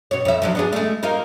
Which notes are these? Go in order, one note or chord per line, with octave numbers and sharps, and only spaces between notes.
B2 C#5
F2 E5
F3 F#3 D4
B3 D4 G#4
G#3 A3
A#3 D#4 F4